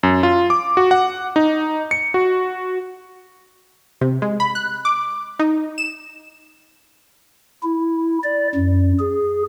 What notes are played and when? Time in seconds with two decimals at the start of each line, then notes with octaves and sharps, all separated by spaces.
0.03 F#2
0.23 F4
0.50 D6
0.77 F#4
0.91 F#5
1.36 D#4
1.91 C#7
2.14 F#4
4.01 C3
4.22 G#3
4.40 B5
4.55 F#6
4.85 D6
5.39 D#4
5.78 E7
7.63 E4
8.24 D5
8.55 F#2
9.00 G#4